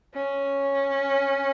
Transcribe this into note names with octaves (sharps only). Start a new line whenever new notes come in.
C#4